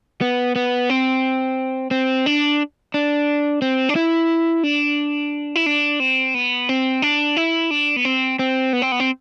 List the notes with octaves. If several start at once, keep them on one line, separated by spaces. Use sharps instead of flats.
B3
B3
C4
C4
D4
D4
C4
D4
E4
D4
E4
D4
C4
B3
C4
D4
E4
D4
B3
C4
C4
B3
C4
B3
C4